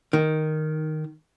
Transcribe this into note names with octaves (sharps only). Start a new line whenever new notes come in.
D#3